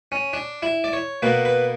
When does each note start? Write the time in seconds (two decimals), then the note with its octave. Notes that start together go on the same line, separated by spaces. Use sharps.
0.12 C#4
0.33 D4
0.63 E4
0.84 D5
0.93 C#5
1.22 B2 A#3 B4
1.45 B4